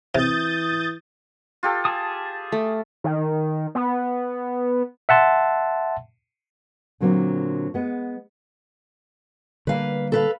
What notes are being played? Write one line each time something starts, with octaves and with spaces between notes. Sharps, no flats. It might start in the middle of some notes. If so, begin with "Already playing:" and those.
C3 E3 D#6 G6 A6
F4 G4 A4
G#4 A5 D#6
A3
D#3
B3
E5 F#5 A5 C6
A#2 D3 F#3 A#3 C4
G#3 B3
D3 G3 A#3 B4 F5
A4 B4 F5